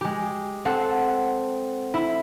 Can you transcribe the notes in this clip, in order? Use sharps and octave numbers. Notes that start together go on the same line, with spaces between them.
G#3 G4
C4 A4 F#5
E4